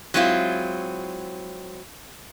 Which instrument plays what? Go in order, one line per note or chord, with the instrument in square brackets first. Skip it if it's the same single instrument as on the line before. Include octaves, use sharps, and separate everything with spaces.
[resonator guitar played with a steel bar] F#3 G#3 C4 E4 F4